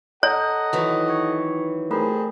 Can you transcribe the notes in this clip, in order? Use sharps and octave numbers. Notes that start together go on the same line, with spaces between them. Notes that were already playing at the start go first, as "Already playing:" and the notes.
A4 C#5 D#5 F#5 A#5
D#3 E3 F#3
C#6 G#6 C#7
G3 A3 C4 G#4 A#4 B5